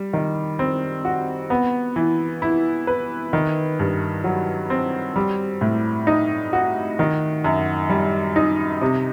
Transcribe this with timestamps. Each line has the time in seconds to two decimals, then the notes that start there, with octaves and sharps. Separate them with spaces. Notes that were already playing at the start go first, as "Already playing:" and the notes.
Already playing: G3
0.13 D#3
0.59 C4
1.05 F#4
1.50 B3
1.96 E3
2.42 E4
2.87 B4
3.33 D#3
3.79 G2
4.24 F#3
4.70 C4
5.16 G3
5.61 A2
6.07 D#4
6.53 F#4
6.99 D#3
7.44 F#2
7.89 G3
8.36 D#4
8.81 C3